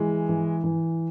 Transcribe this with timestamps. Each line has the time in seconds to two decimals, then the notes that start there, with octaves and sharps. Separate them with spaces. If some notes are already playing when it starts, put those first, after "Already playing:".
Already playing: E3 G#3
0.29 E3
0.64 E3